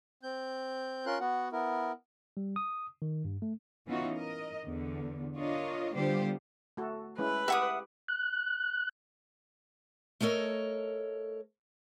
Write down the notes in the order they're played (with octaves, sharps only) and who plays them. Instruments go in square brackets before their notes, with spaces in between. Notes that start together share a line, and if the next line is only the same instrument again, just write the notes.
[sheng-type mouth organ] C4 G6
C#4 F4 A#4 C6 F#6
B3 F#4 F#5
B3 E4 A#4
[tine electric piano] G3
D#6
D#3
G2
A3
[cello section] E3 B3 C#4 D#4 F4 F#4
A#4 D#5
E2 D3
D4 F4 A#4 C#5 D#5
D3 G3 B3 F4 G4 C5
[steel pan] A3 F#4 A4
[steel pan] G#3 C#4 E4 [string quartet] B4
[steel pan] G4 [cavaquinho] E5 F#5 D#6
[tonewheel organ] F#6
[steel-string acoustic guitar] A3 A4 A#4 C#5 D#5